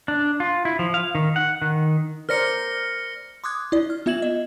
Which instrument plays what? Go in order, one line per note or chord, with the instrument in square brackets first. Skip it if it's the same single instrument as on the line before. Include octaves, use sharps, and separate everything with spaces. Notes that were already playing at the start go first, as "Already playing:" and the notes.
[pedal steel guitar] D4
F4
E4
F3
F5
D#3
F#5
D#3
[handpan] A#4 C5 D5 [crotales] F6 A#6 C#7
[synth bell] C6 D6 D#6 F#6 G#6
E4 D5
F6
B3 F4 E5 G#6 E7 F#7
D#5